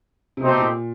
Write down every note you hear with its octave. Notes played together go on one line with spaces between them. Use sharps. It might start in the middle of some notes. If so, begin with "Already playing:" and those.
C3
B2 A3 C4 D#4 G4 C5
A#2